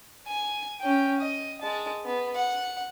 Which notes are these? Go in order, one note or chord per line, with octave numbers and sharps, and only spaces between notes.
G#5
C#4 G5
D#5
G#3 A5
B3
F#5